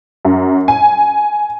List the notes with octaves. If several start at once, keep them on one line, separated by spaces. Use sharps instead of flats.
F#2
G#5